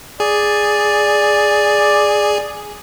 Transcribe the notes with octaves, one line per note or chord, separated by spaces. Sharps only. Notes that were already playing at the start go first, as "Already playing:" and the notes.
G#4 D5